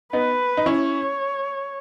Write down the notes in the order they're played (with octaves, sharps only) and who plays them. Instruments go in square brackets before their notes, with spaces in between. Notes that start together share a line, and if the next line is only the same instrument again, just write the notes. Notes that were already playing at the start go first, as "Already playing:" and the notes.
[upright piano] B3 D#4 [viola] B4
[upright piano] D#4
[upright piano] C#4 E4 [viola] C#5